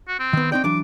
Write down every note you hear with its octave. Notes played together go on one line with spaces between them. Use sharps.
F#4
C4
D#3 B3
C4 D#4 D5 G5
E3 F#3 D4 D6